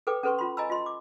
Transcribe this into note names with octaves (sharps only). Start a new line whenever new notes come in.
A4 B4 G5 D6
C#4 A4 B4 C6 C#6
C#4 F4 B5 C6
D#5 G#5 A#5 B5 E6
F4 D#5 C6
D6